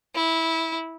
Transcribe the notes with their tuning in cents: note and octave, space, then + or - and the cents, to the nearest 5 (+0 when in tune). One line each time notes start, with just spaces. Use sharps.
E4 -15